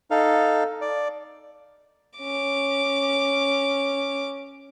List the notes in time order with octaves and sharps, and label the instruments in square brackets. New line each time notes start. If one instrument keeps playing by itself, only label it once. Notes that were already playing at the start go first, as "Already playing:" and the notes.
[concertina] D#4 A4 F5
D5
[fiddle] C#4 D6